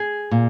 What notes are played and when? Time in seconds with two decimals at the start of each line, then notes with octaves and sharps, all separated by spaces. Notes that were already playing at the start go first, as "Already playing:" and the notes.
Already playing: G#4
0.31 A#2